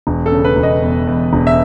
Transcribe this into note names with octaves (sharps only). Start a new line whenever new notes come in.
E1
A4
C#3
B4
E1
D#5
E2
E2
E1
E5